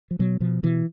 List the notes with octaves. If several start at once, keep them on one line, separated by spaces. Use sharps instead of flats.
F3
B2 F#3
B2 F3
B2 E3